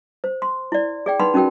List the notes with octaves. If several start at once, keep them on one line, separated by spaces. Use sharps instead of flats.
C5
C6
E4 D5
G#4 D5 G5
D#4 B4 F#5 B5 C6
C#4 D#4 F#4 A#4 G5